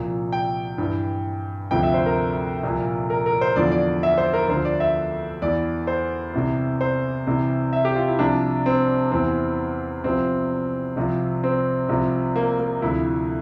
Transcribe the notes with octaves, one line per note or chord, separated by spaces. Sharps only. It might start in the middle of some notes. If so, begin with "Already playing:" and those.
Already playing: C2 A#2 F3
G5
G2 E3
D2 C3 F3 G5
E5
C5
A#4
C2 A#2 F3
A#4
A#4
C5
E2 D3 F3 D5
D5
E5
C5
A#4
D2 D3 F3 C5
D5
E5
E2 E3 D5
C5
C2 C3 E3
C5
C2 C3 E3
E5
G4
F4
E4
C2 C3 F3 D4
C4
E2 E3 C4
C2 C3 F3 C4
C2 C3 F3
C4
C2 C3 F3
A#3
A#3
D2 C3 F3 E4